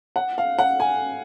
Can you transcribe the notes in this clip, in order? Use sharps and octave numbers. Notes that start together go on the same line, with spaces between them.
F#5
F5
F#5
G#5